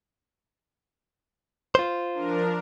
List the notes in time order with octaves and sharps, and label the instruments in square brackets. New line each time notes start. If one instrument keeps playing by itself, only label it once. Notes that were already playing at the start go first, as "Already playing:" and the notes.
[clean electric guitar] F4 C5
[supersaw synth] F3 D4 A#4